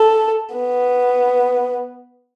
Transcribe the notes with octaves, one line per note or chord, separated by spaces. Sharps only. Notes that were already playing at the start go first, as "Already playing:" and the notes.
Already playing: A4
B3